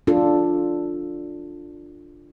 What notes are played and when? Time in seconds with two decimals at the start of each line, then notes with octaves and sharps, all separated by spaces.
0.07 D4 F4 A4